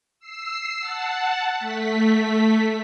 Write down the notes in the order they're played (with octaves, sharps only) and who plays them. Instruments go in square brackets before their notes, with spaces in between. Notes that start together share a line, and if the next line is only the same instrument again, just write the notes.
[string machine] E6 C7
F#5 A5
A3 B6